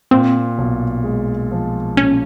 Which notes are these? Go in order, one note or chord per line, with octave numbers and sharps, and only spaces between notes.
A#2 C4
B1
G#3
F3
A#2 C#4